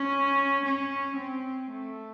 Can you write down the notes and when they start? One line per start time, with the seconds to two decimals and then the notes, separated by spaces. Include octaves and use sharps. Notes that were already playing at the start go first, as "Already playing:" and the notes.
Already playing: C#4
0.67 C#4
1.18 C4
1.72 A3